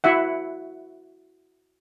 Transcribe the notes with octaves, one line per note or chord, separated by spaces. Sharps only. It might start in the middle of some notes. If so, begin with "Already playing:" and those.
E4 F#4 E5 F#5